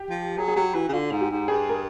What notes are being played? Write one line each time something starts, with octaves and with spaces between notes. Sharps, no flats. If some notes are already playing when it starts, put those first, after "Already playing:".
Already playing: G4
F3
F#3 G#4
G#4
F#3 G4
E3 F#4
C#3
D3 F4
G#2
G4
G#2
G2 G#4
A#4